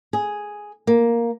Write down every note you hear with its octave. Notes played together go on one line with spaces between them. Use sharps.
G#4
A#3